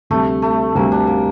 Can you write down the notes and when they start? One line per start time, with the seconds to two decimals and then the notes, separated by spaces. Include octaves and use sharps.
0.10 D2 C3 G3 A3
0.42 A3
0.75 D2 C3 G3 A#3
0.92 D4
1.07 A#3